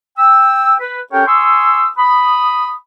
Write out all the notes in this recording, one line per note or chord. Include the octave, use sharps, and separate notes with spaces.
G5 E6
B4
C#4 G4 A4 A#4 C#5 G5
G#5 C6 C#6 D#6 E6
B5 D#6